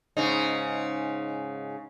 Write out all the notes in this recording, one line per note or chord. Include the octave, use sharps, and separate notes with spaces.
G#2 C#3 D#4